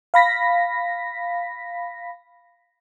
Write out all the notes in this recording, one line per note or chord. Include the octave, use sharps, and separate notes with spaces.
F5 B5 A#6 B6